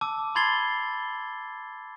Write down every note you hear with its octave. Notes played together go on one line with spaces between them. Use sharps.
A5 D6 E6
B5 C6 G#6 A6 C7 G7